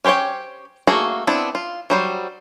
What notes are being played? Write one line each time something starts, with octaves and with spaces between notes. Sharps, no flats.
C#4 G4 C5 C#5 G5
A3 A#3 F#4 G#4
B3 C4 D4 E4 A5
F4
F#3 G3 C5